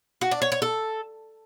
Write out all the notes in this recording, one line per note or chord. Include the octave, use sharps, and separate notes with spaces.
F#4
D4
C#5
C#5
A4